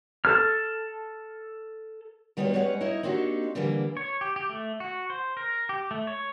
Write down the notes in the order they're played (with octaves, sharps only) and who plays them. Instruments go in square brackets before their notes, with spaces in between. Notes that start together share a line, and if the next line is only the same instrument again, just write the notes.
[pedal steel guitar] A4 F6
[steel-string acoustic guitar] D#3 G3 B3 F4 F#4 C#5
G3 G#3 C#4 B4 C#5 F#5
D#4 E4 C#5 D#5
A#3 C4 D4 D#4 F#4 G4
D3 E3 F3 G3 A#3 C4
[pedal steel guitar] C#5
G4
G4
A3
F#4
C5
A#4
G4
A3
C#5